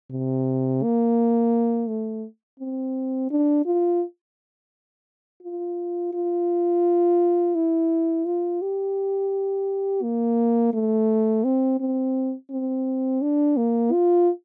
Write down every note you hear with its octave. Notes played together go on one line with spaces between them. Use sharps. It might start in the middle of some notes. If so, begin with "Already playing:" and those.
C3
A#3
A3
C4
D4
F4
F4
F4
E4
F4
G4
A#3
A3
C4
C4
C4
D4
A#3
F4